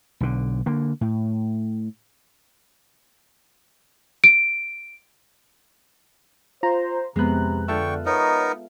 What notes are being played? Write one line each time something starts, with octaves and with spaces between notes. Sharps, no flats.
B1 D3
D3 A#3
A2
D7
F4 C5 A#5
F2 C3 G#3 B3 A#5 F#6
D3 F4 A4 E5 G5 C#6
B3 D#4 A#4 C#5 D#5